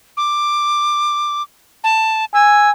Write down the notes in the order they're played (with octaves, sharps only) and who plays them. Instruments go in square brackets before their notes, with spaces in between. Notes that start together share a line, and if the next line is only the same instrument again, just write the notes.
[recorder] D6
A5
[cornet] G#5 [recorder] E6